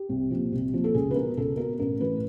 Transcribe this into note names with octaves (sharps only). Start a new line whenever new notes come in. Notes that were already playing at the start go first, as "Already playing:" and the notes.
Already playing: G4
C2
A#2 F3
C2
A#2 F3
A4
C#2 G#4
B4
B2 A#4
C#2 A4
B2 A#4
A1 A#4
A2 E3 B4